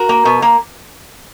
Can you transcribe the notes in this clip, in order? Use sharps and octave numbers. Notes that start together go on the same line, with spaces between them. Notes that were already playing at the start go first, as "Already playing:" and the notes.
Already playing: F#4 A#4
A#3
B2
A#3